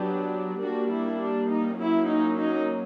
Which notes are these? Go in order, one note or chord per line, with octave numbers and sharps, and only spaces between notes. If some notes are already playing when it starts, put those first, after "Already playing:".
Already playing: F#3 B3 D4 G4
G3 A#3 D4 F#4
E4
D4
D#4
F#3 A#3 C#4 E4
D#4
D#4